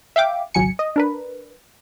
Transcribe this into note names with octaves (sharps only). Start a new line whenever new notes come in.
E5 F5 G5 D6
G#1 C#2 F#3 G#5 C#7
D#5
D4 A#4 B4